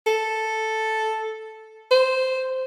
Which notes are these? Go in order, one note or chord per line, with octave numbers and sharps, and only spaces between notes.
A4
C5